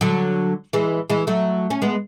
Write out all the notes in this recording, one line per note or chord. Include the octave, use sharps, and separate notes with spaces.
D3 F#3
E3 G#3
E3 G#3
F#3 A3
C#4
G#3 B3